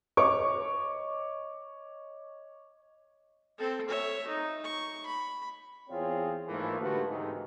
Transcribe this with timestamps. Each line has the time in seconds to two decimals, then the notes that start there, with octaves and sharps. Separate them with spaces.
0.17 C#5 D#5 C#6 D6
3.58 C4 A4
3.88 C#5 E5
4.27 D#4
4.64 C#6
5.06 B5
5.89 E2 C4 F4 G#4 C#5
6.48 G#2 E3 F3 A3 A#3
6.80 D3 F3 A3 F#4 G4 B4
7.09 G#2 C3 D#3 E3 G#3